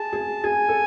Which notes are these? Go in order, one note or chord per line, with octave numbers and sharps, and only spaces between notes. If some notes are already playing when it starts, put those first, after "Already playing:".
Already playing: G#4 A5
G#4
G#4 G#5
A4